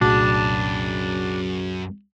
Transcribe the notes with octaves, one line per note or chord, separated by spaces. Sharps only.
C2 F#2 A#2 A3 D4 F#4 G#4 A5